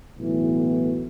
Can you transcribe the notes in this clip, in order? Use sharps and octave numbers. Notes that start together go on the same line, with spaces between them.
B1 A2 E3 B3 F#4